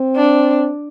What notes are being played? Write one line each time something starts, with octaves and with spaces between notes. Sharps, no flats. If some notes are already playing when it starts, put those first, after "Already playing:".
Already playing: C4
D4